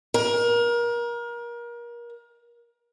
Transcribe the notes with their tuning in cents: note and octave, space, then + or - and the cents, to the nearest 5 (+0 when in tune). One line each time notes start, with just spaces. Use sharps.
A#4 +30